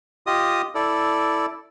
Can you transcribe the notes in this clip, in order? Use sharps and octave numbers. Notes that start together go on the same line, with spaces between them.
F4 G4 D#5 D#6
E4 A4 D5